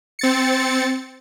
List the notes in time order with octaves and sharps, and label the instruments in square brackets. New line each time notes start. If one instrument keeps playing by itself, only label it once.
[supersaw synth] C4 A6 C#7